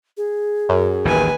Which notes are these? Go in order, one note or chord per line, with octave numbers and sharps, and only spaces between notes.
G#4
F#2
A1 D#2 D#3 B4 G#5